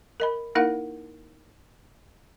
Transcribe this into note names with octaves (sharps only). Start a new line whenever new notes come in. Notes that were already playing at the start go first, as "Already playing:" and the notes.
A#4 D#5 B5
A#3 D#4 E4 A#4 F5 F#5